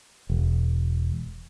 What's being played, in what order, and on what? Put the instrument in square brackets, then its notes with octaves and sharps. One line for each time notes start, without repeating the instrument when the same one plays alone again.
[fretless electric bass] E1